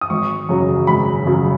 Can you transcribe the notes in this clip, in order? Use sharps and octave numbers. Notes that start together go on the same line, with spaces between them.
D#6
G#1 C#6
F#2 C#3 F#3
G#1 B5
F#2 C#3 F#3